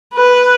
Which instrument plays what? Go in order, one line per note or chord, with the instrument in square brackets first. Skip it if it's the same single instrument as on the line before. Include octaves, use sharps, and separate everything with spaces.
[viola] B4